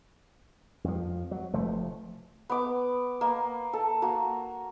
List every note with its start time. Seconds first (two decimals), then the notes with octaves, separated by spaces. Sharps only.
0.84 F2 F3
1.31 F#3
1.53 F1 F3 A3
2.50 B3 D6
3.21 A#3
3.73 A4
4.02 A#3 F#4